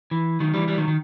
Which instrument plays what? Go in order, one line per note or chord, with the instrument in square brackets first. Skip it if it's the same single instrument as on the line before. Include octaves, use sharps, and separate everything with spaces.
[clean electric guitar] E3
D#3 F#3
E3 G3
E3 G3
D#3 F#3
D#3